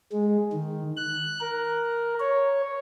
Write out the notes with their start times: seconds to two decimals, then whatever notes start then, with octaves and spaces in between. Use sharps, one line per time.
0.12 G#3
0.53 D#3
0.97 F#6
1.41 A#4
2.20 C#5